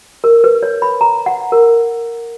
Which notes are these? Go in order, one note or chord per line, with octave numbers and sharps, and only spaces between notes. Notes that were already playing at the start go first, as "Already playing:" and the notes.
A#4
B4
C#5
B5
A#5
F#5
A#4